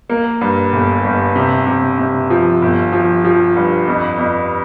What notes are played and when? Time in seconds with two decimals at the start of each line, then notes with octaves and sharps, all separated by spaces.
0.10 A#3
0.41 G2
0.73 G1
1.04 G1
1.36 C3
1.67 C3
1.99 C3
2.30 F3
2.62 G1
2.92 F3
3.24 F3
3.56 G2
3.88 F2
4.18 F2